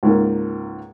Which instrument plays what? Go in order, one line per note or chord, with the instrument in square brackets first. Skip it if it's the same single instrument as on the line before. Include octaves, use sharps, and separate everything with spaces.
[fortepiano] C#2 G#2 A#3